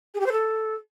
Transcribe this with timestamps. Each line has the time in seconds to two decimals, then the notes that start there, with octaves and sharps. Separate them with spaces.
0.14 G#4
0.20 G4
0.26 C5
0.32 A4